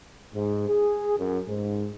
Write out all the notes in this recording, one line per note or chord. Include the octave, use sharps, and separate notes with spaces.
G#2
G#4
F#2
G#2